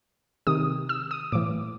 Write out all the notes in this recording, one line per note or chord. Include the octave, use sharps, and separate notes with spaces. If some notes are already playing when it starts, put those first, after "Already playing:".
C3 D#3 D#6
E6
D#6
A2 E3 D6